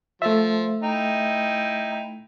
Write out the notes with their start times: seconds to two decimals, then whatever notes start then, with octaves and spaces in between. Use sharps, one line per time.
0.22 F3 A3 E5
0.83 D#4 E4 G5